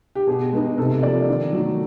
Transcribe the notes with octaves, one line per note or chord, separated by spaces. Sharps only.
G4
B2 G#4
G#3 B3 D#4
C3 A4
F3 A#3 D5
D#3
F#3 A3